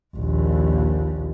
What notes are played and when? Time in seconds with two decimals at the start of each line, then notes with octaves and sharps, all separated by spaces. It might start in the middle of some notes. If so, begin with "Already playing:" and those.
0.16 A#1 D#2